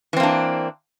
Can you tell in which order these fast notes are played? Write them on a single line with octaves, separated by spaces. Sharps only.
E3 C4 A#3 D4